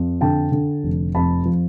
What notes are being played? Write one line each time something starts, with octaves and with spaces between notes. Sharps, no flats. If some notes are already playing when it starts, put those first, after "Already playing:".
Already playing: F2
D3 G5 A5
D3
F1
F2 A5 B5
F3